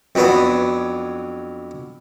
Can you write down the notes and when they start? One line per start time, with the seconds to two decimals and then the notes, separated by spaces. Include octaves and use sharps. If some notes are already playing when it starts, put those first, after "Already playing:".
0.15 F2 F#3 B3 D4